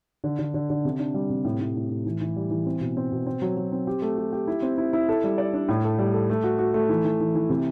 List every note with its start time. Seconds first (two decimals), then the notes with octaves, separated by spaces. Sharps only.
0.24 D3
0.39 D3
0.54 D3
0.70 D3
0.85 C3
0.99 D4
1.14 G3
1.30 C3
1.44 A2
1.60 A2
1.75 A2
1.90 A2
2.06 E3
2.21 E3
2.36 G3
2.50 E3
2.66 C4
2.81 B2
2.97 C4
3.12 B2
3.26 C4
3.42 F#3
3.57 F#3
3.72 C4
3.87 G4
4.02 A3
4.18 G4
4.33 G4
4.47 E4
4.62 C4
4.78 E4
4.93 E4
5.09 A4
5.24 G3
5.38 D5
5.53 D4
5.69 A2
5.84 A4
5.99 G3
6.14 A4
6.30 A3
6.44 F#4
6.59 F#4
6.74 A3
6.89 E3
7.04 E3
7.20 E3
7.35 E3
7.50 C3